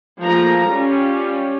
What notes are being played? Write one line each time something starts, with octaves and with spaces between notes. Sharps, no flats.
F3 A3 A#3 G#4 A#5
G3 C#4 F4